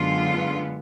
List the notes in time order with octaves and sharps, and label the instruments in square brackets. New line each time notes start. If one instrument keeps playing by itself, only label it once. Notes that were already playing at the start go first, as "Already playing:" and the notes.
Already playing: [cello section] F#2 D3 G#3 B3 F4